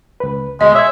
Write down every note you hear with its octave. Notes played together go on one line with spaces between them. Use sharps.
C#2 B4
D2 B2 G#3 D#5
C#5 E5 E6 G#6